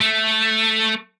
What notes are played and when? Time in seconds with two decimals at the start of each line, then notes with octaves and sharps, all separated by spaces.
0.01 A3